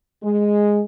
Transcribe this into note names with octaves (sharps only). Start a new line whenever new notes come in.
G#3